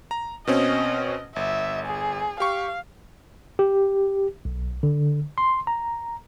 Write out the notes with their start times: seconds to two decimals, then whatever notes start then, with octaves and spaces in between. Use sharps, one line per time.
0.11 A#5
0.47 B2 C4 C#4 D#5
1.36 G1 E5
1.86 G#4
2.40 G4 F5 C#6
3.59 G4
4.45 B1
4.83 D3
5.38 C6
5.67 A#5